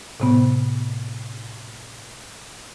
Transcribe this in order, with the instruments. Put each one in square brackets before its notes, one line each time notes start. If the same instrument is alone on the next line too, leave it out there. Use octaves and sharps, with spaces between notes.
[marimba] A2 C3 B3